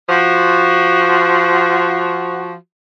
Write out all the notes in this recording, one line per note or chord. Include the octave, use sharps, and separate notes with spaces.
F3 F#4